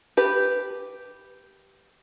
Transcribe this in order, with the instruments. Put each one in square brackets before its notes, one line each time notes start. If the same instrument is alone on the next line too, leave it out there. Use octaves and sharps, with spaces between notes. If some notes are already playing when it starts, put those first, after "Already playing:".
[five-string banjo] G4 B4